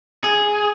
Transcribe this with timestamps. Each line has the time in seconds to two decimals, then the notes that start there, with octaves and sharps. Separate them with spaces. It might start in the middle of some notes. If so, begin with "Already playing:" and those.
0.24 G#4